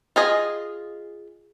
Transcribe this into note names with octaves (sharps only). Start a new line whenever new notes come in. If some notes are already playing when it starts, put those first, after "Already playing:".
F4 G#4 D#5